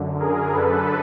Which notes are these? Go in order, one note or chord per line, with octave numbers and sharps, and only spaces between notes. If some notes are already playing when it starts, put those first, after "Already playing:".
Already playing: F#2 D3
G#4 A#4
F#2 D3 A4 B4